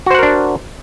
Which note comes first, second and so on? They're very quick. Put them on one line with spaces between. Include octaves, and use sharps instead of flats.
F#4 C5 F#5 A#4 D4